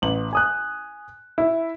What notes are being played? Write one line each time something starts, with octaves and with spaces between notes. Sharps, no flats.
A1 F#7
G#5 D#6 F#6
E4